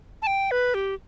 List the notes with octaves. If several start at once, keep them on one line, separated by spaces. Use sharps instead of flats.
A5
G5
B4
G4